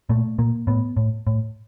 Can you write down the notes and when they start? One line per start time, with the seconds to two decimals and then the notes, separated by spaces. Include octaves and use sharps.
0.09 A#2 A3
0.38 A#2 A#3
0.67 A2 B3
0.97 A2
1.27 A2